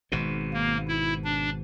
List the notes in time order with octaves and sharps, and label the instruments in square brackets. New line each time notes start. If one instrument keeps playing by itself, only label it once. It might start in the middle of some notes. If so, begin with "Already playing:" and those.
[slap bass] G#1 G#2 B2
[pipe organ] A#3
E4
D4